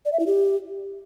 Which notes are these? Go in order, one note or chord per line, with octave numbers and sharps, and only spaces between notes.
D5
E5
E4
G4